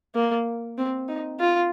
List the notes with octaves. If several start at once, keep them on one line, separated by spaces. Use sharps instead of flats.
A#3
C4
D#4
F4